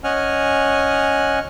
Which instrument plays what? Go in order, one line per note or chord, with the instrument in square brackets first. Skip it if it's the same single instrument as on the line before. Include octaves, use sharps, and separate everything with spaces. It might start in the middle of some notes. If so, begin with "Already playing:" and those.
[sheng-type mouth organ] C#4 D#5 F#5 G#5 F6